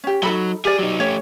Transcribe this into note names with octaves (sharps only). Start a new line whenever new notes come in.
C#4 G4
F#3 D#4 A4 B5
G4 G#4 A#4 D5
F#3 D#4
A3 C#4 G4 C#5